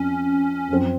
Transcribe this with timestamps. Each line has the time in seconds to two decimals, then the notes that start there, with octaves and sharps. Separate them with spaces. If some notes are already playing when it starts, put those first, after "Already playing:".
Already playing: F2 C#4
0.68 F#2 F3 C4